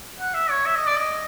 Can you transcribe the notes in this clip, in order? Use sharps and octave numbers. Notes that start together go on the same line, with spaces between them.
F#5
E5
C#5
E5
D#5
D5
D#5